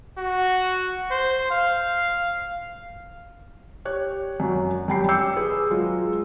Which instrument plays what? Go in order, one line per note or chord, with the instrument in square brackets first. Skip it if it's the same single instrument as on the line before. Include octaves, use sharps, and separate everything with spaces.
[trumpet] F#4
C5
F5
[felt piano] G4 C#5 F#6
F#2 F#4
F#2 G3 G5 B5 C7
D6 E6 G6 C7 C#7
G#4 B4
F#3 G#3 F4